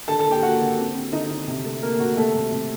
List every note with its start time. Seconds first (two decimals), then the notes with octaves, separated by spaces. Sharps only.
0.08 D3 A4 A5
0.19 A4 A5
0.25 A#3
0.31 G4 G5
0.43 A#3 F#4 F#5
0.61 D3
0.78 C4
0.96 C4
1.12 D3 D#4 D#5
1.31 D3
1.48 C3
1.65 A3
1.82 A3 A#3 A#4
2.00 C3 F#4
2.17 C3 A3 A4
2.35 C3
2.52 C3